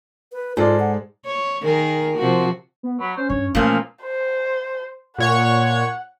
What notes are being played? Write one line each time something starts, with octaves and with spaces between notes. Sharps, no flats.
B4
G#2 G#3 F4 A4 D5
F#5
C#5
D#3 G#4 A#4
C3 F3 F#4
B3
F#3 B5
C#4 C5
G2 C#5
A#2 E3 F3 A3 A#3 C#4
C5
A#2 C#5 F#5 C#6